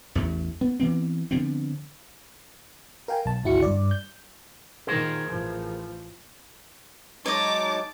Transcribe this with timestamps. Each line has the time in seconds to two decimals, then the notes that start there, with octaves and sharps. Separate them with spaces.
0.15 A1 E2 A3
0.61 B3
0.80 E3 B3 C4
1.31 D3 F3 B3 C4
3.08 A#4 F5 G5 G#5
3.25 B1 A5
3.44 G#1 D2 E4 F#4 C#7
3.62 G2 D5
3.91 G6
4.87 A#2 D#3 G#4 A#4 C5
5.28 A1 F3
7.26 F#3 G#3 D#4 C#5 D#5 A5 D6